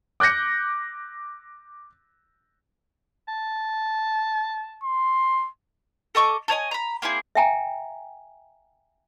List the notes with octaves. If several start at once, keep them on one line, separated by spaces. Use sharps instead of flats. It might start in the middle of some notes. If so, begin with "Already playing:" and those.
D6 F#6 G6 A#6 C#7
A5
C6
A4 D#5 C#6 D6
A4 C#5 D#5 G#5
A#5 B5
A#3 C4 E4 G#4
E5 F5 G5 G#5 A#5